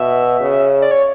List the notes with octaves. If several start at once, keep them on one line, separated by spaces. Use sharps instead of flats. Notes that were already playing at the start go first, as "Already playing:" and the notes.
Already playing: B2 E5
C#3
D5
C#5